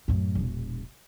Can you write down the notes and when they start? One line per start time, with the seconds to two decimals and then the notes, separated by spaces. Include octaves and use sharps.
0.08 F#2 A2
0.35 E1 A#1